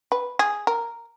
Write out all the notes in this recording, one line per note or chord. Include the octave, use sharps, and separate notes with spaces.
B4
G#4
A#4